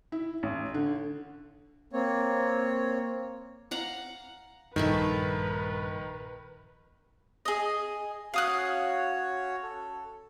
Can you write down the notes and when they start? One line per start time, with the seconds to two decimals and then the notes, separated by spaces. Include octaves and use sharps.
0.12 E4
0.43 A1
0.74 D3
1.93 A#3 C4 C#5
3.71 F5 F#5 A#5
4.76 A#1 G2 D#3 A3 A#4 B4 E5 G#5
7.45 G#4 D#5
8.34 C#4 F#4 C#5 F5 D#6 F#6
9.63 A4